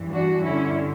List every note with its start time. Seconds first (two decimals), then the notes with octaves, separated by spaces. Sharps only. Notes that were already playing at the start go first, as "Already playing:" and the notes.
Already playing: G2 E3
0.11 D4 F#4
0.42 G2 D3 C#4 E4